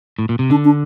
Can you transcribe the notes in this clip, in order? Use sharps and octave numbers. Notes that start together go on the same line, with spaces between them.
A2
A#2
C3
D3 D4
D4